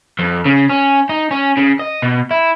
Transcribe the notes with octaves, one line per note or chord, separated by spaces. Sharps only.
F2
C#3
C#4
D#4
C#4
C#3
D#5
B2
E4